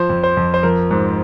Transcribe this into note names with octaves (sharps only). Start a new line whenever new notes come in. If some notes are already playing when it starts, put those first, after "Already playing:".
Already playing: F3 C5
F2
C5
F2
C5
F3 A#4
G#2